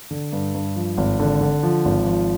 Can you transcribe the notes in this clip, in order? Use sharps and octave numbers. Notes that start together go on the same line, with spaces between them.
D3
G2
G2
F3
G#1
D3
D3
F3
G#1
F3